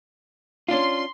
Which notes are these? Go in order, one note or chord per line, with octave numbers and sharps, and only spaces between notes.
C#4 D4 F4 C6